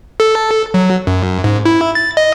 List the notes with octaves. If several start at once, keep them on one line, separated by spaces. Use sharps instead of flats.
A4
F#3
F#2
G#2
E4
A6
D#5